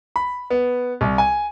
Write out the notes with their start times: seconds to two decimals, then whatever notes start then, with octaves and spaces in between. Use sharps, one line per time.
0.16 B5
0.50 B3
1.01 C2
1.18 G#5